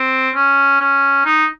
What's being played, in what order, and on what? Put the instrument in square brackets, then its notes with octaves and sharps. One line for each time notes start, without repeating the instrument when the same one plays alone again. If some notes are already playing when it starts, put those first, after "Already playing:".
Already playing: [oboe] C4
C#4
C#4
D#4